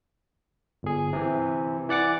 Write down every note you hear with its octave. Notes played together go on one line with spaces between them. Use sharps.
G1 G#4
C3 E3
E3 D5 F#5 D6